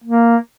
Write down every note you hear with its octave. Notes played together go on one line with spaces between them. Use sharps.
A#3